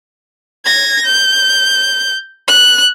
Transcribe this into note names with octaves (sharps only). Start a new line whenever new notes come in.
G#6 A#6
G6
F#6